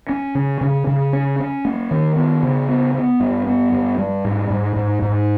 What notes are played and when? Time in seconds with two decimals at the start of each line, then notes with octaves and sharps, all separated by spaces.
0.09 C#4
0.35 C#3
0.61 C#3
0.87 C#3
1.13 C#4
1.39 C#4
1.65 A#3
1.91 D#3
2.16 B3
2.43 C#3
2.69 B3
2.94 B3
3.20 G2
3.47 B3
3.72 G2
3.98 G3
4.24 G#2
4.50 G#2
4.76 G#2
5.02 G#2